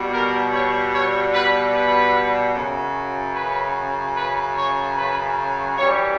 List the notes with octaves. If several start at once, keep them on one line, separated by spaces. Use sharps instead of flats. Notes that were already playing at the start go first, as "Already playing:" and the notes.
Already playing: B2 G3
A#4
C#5
C#5
B4
B4
F#2 C#3 F#3
B4
B4
C#5
B4
F#2 E3 G3 C#5